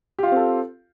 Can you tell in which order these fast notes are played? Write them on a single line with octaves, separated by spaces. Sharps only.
G4 F4 F5 C4 A4